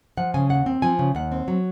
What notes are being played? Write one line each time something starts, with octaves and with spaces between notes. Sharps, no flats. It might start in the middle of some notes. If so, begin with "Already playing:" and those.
F3 F#5
C#3 G#5
D#2 F#5
C4
F3 G#5
C#3
D#2 F#5
C4
F#3